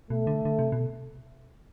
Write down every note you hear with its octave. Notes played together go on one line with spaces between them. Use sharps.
B2 A3
D3
D3
C3
B2